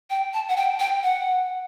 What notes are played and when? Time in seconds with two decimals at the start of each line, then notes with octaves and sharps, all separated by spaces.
0.10 G5
0.34 A5
0.49 F#5
0.57 G5
0.80 G5
1.03 F#5